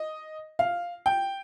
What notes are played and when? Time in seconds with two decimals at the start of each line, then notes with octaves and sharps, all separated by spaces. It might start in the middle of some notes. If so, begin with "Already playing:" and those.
Already playing: D#5
0.59 F5
1.06 G5